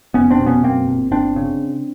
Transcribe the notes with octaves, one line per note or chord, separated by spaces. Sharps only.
F1 B3 C#4
C4 D4
B2
B3 C#4
F#2 A#3 C4
G1
G1 C4 D4
C#3